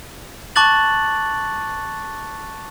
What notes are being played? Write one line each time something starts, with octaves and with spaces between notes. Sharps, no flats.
A5 C#6 D6 F#6 A6 F#7